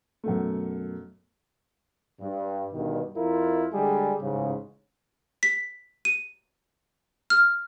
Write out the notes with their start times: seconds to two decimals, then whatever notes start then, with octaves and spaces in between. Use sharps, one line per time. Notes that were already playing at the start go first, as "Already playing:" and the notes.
0.24 F#2 B2 A3
2.21 G2
2.74 D2 G2 B2 D#3
3.17 F2 E4 F4 A#4
3.73 D3 G3 G#3 G#4
4.20 A1 G#2 C#3
5.43 B6
6.05 D#7
7.30 F6